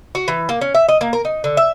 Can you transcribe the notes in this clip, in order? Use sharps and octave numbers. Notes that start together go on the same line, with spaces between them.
F#4
E3
A#3
C#4
E5
D#5
A#3
A#4
D#4
D3
E5